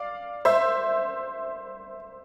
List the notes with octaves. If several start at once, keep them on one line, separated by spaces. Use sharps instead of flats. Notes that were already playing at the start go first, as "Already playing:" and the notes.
Already playing: D5 F5
C5 E5